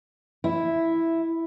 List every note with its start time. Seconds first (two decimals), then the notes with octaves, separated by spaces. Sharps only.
0.44 E4